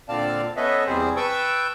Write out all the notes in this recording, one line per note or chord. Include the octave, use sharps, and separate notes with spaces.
A#2 D3 C4 D5 F5 A5
B3 C#4 A4 B4 D#5 E5
E2 C3 G3 C4 G#4 C5
B4 G5 A5 C#6 E6 G6